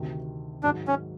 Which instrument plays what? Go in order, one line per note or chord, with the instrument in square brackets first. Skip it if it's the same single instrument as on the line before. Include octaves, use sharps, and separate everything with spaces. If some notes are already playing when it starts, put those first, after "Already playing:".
Already playing: [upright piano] D2 C3 D#3
[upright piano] G#2 D#3 F#3 [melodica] D4
[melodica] C#4